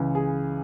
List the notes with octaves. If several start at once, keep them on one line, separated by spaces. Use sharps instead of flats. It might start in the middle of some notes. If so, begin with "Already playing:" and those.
Already playing: C#2 C#3 E3
G#4